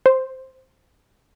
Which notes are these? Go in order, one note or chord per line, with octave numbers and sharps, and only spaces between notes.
C5